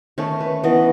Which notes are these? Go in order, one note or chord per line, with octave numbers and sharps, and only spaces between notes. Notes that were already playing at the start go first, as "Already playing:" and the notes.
D#3 A3 C#4 C#5
B4
E3 B3 D#5